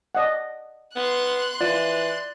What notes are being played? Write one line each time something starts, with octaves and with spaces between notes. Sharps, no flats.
D5 D#5 F#5
B3 C6 F#6
E3 F4 D5